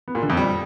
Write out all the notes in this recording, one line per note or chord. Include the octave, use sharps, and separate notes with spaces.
B3
A#2
D3
F2
G3